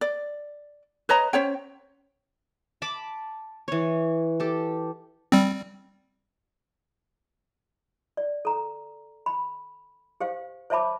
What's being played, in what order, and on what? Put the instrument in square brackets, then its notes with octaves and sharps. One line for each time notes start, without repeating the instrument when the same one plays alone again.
[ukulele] D5
B4 C#5 D#5 A#5
C#4 C5 C#5 G5
[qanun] A5 B5 D6
E3 C#5
G4 A4
[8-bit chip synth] G3 C4
[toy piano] D5
A4 A#5
B5
G4 C5 F5
C5 C#5 E5 A5 B5 D6